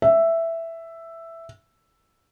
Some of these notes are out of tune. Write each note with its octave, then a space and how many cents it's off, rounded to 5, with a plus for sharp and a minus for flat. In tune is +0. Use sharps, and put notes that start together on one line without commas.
E5 +5